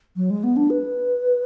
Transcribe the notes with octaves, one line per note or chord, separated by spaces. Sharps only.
F#3
G#3
B3
D4
B4